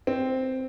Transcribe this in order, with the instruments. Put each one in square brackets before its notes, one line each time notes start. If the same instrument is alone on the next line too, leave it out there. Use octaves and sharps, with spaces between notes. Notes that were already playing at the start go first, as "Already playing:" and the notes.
[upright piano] C4